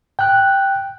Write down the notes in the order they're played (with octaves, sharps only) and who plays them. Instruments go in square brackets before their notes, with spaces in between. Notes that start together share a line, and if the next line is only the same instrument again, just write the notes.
[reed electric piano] G5 F#6